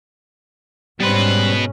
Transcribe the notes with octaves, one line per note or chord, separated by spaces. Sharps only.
G#2 B2 G3 C#4 B4 C5